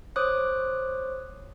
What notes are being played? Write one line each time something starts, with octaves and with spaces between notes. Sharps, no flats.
C5 C#5 D6 D#6 F#6